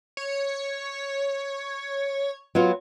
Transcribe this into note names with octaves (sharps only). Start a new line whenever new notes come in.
C#5
F#3 B3 F4